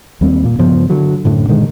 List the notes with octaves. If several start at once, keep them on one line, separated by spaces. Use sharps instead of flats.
D#2 G3 A#3 C4
A#2
G2 C#3 F3 B3
D3 F#3
F#2 A2 D3
A#2 D3 D#3 G#3